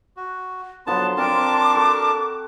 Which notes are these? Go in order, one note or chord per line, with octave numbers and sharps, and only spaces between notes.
F#4
D3 F3 F#3 B3 A5 C6
C4 D4 A#4 F5 A5 D6
F#4 A4